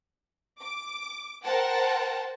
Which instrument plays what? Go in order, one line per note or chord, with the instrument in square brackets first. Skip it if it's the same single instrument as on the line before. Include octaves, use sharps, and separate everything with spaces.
[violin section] D6
A#4 C5 F#5 G5 A5